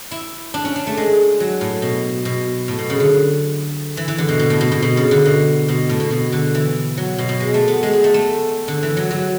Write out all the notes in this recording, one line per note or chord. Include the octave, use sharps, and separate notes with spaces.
E4
D4
C#4
D4
A3
G#3
F#3
A2
B2
B2
A2
B2
C#3
D3
E3
E3
D3
B2
B2
A2
B2
B2
B2
C#3
D3
B2
B2
A2
B2
B2
D3
E3
F#3
B2
B2
G#3
A3
B3
G#3
G#3
A3
A3
D3
E3
F#3
F#3